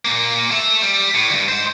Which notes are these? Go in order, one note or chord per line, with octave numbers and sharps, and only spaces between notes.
A#2 A#3
A4 E5
G3
A2
D2 G2
G#2 C5